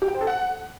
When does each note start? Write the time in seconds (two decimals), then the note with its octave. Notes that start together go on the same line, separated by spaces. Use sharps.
0.02 G4
0.08 G5
0.14 C5
0.21 A4
0.27 F#5